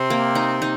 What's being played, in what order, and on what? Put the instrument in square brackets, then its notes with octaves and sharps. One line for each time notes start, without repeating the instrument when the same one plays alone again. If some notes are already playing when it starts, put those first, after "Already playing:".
Already playing: [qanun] C3 [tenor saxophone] C4
[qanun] A#3
D#4
D#4